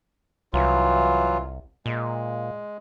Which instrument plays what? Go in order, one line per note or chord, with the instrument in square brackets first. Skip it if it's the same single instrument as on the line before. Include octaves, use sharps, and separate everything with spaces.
[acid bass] C2 [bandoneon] E3 F#3 F4
[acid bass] A#2 [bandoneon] G#3